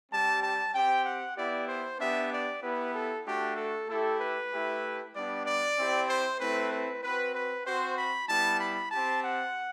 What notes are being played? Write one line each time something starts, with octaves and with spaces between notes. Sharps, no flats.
G3 C4 G4 A5
A5
C4 G4 G5
F#5
B3 E4 G4 D5
C5
B3 D4 G4 E5
D5
B3 E4 G4 B4
A4
A3 D4 F#4 G4
A4
A3 E4 G4 A4
B4
A3 E4 G4
G3 B3 D4 D5
D5
C4 E4 G4
C5
A3 C4 E4 B4
B4
C4 F#4 B4
B4
C4 F#4 C5
B5
G3 B3 E4 A5
B5
C4 G4 A5
F#5